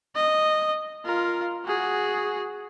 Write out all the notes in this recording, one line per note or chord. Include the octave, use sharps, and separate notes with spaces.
D#5
F4 A#4
F#4 G#4